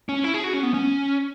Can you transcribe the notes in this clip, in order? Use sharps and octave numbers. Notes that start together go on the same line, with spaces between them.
C#4
E4
G#4
F#4
C#4
B3
C#4